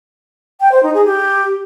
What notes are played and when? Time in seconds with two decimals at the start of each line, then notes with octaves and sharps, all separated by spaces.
0.60 G5
0.72 C5
0.83 D#4
0.94 G#4
1.05 G4